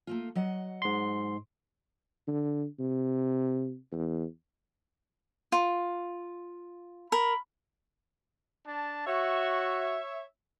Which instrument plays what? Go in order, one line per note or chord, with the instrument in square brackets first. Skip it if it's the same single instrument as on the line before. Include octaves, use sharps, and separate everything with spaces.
[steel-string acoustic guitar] A3 A#3 F4
F#3 D#5 F#5
[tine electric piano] G#2 C6
[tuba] D3
C3
E2
[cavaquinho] F4
[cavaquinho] A#4 [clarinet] B5
[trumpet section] D4 A5
[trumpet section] F#4 [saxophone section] C#5 E5